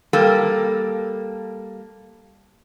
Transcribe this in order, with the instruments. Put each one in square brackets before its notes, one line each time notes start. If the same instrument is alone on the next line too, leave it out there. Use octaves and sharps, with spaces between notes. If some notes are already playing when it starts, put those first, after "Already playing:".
[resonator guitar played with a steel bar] G3 A#3 A4